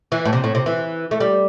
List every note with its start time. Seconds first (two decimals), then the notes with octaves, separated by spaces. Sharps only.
0.12 E3
0.25 A2
0.33 C3
0.44 A2
0.55 C3
0.66 E3
1.11 A3
1.20 G3